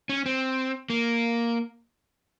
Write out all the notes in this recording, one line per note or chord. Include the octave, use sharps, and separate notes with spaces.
C#4
C4
A#3